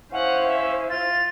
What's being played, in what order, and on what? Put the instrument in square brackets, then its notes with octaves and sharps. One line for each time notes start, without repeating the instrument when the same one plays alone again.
[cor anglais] C#4 [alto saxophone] E4 [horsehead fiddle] C5 F5 [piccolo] F#5
[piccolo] E5
[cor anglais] F4 [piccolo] A6